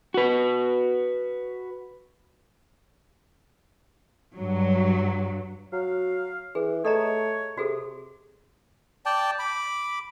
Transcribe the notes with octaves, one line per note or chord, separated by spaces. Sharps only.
F#4 B4
G2 F#3
F#3 F5
E3 G#4
A3 A4 C#5 D#5 A#5
C3 F#4 G#4 A4
D5 G5 A5
B5 D6